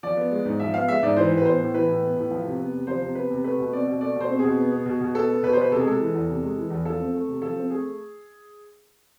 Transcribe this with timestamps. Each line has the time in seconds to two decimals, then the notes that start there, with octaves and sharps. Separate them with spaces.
0.03 F3 D5
0.17 B3
0.31 G#3
0.45 G#2
0.60 F3 E5
0.74 B3 F5
0.88 G#3 E5
1.03 G#2 D5
1.16 E3 C5
1.31 A2
1.37 B4
1.45 B3 C5
1.59 A2
1.74 E3 B4
1.88 A2
2.02 B3
2.16 A2
2.31 F3
2.44 C3
2.59 B3
2.73 C3
2.87 F3 C5
3.02 C3
3.15 B3 B4
3.30 C3
3.44 A3 B4
3.58 B2
3.73 C4 D5
3.87 B2
4.01 A3 D5
4.16 B2 C5
4.30 C4
4.39 G#4
4.44 B2
4.58 B3
4.72 B3
4.86 B2
5.01 B2
5.15 B3 A4
5.29 B3
5.43 B2 B4
5.53 C5
5.57 B2 B4
5.71 C3 A4
5.80 G#4
5.85 G#3 A4
6.00 E3
6.14 E2
6.29 C3
6.43 G#3
6.57 E3
6.70 E2
6.85 F3 A4
7.00 C4
7.14 A3
7.28 C3
7.42 F3 A4
7.56 C4
7.70 A3 G#4